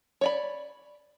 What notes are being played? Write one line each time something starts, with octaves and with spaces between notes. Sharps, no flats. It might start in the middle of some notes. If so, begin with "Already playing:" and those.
C#5 D5 B5